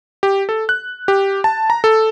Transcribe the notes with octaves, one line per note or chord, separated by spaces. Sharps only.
G4
A4
F#6
G4
A5
A#5
A4